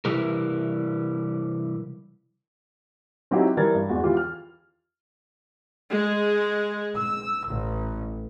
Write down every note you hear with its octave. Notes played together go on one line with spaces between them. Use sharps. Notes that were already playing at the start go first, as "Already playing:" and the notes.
C3 E3 G3 A#4
F#3 C4 D#4 E4 F#4 G4
E3 G3 A#4 G#6 A6
G2
E2 G#3 F#4
E3 F4 G4
F6
G#3
E6
A1